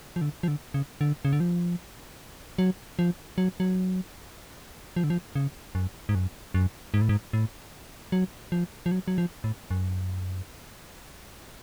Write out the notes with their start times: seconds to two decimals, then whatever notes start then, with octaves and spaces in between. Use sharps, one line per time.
0.16 F3
0.21 D3
0.43 F3
0.48 D3
0.74 C#3
1.01 D3
1.25 C#3
1.33 D3
1.40 F3
2.58 F#3
2.99 F3
3.38 F#3
3.60 F#3
4.96 F3
5.04 D3
5.10 F3
5.35 C#3
5.75 F#2
6.09 G#2
6.15 F#2
6.54 F#2
6.94 G#2
7.01 A2
7.09 G#2
7.33 A2
8.12 F#3
8.52 F3
8.86 F3
8.92 F#3
9.08 F#3
9.18 F3
9.44 A2
9.71 F#2